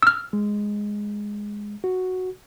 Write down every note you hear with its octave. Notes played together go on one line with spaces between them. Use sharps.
E6 F6
G#3
F#4